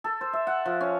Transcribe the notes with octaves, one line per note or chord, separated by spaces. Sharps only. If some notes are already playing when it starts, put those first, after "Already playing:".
A4
C5
E5
F#5
F3
C#4